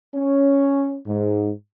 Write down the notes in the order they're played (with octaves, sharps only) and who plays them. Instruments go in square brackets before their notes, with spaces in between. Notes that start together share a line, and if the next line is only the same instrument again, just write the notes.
[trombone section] C#4
G#2